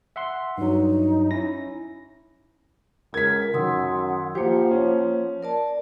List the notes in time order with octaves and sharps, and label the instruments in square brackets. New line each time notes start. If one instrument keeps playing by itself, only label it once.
[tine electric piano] E5 F#5 C6
[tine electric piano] G2 F#3 [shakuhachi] D#4
[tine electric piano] C#4 E4 A#6
[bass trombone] C#2 [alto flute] A#4 [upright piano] G#6 B6
[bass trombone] F#2 [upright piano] D#3 [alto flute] F#5 [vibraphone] C6 D#6 E6
[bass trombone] F3 [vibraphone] A#3 C5 [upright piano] G4
[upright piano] C#4
[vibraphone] A#4 D5 A5